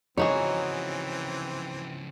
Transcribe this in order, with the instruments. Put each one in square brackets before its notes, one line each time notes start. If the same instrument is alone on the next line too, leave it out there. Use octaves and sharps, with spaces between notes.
[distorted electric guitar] C#3 F3 [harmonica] E3 C4 [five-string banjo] D#4 F#4 G#4 [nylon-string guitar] C#5